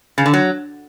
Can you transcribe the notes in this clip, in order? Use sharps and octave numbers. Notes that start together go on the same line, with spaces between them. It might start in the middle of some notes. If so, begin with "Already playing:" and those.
C#3
D3
F#3